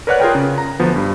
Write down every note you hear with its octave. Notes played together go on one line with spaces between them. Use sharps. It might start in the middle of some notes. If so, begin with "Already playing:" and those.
A#4 B4 C#5 D5 F#5 F#6
F4 G#4 A#4 G5
C#3
A#5
D2 F3 B3
G2